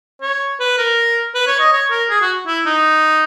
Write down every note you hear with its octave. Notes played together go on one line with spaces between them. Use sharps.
C#5
B4
A#4
B4
C#5
D#5
C#5
A#4
G#4
F#4
E4
D#4